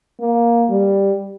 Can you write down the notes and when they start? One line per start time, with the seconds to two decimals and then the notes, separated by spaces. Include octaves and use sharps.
0.20 A#3
0.70 G3